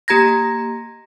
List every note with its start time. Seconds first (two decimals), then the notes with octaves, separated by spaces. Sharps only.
0.08 A#3 G4 A#5 G#6 A#6